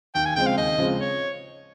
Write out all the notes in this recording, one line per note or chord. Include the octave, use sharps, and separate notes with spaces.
D#2 G5
G#5
C#3 F3 G#3 C4 G5
F5
D#2 D#5
C#3 F3 G#3 C4
C#5